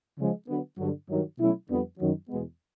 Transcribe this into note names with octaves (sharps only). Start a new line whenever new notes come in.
C#3 F3 G#3
D3 F#3 B3
G2 D3 F#3
G2 D#3 F#3
B2 F#3 A3 C#4 E4
F2 D3 G3 B3
F#2 D#3 F#3
E2 B2 G#3 B3